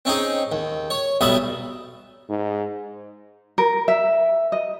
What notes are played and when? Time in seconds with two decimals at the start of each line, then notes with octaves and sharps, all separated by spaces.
0.05 C4 C#4 D#4 G#4
0.52 D#2
0.90 C#5
1.21 B1 F#3 G3 B3 E5 D#6
2.29 G#2
3.58 A#4
3.88 E5
4.52 D#5